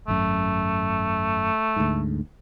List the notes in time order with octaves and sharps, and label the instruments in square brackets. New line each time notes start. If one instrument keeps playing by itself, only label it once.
[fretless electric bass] G#1 F#2 [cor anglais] A3
[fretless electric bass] D2 G#2